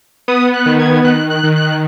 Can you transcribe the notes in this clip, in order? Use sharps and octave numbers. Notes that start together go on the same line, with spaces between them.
B3 D#6
F#6
D#3
G#6
D#3 F#6
F#6
D#3
F#6